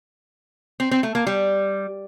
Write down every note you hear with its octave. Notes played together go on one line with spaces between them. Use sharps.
C4
C4
A3
A#3
G3